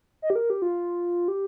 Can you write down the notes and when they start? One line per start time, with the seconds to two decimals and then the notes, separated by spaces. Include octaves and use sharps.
0.22 D#5
0.30 G4
0.36 A#4
0.50 G4
0.62 F4
1.28 G4